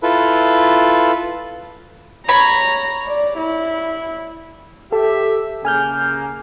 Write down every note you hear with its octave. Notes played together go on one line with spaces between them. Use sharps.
E4 F4 A4 B4
C#5 A#5 B5
D5
E4
G4 A4 E5
C#3 A#3 G#5 F6 G6